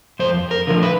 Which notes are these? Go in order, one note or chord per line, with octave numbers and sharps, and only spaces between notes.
F2 C5
A#4
D3 F3 A3
B4